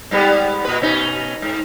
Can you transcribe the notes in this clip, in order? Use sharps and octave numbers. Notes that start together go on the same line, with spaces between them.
G#2 G3 B3
A#2 B4
B2 C#4 D#4
G#2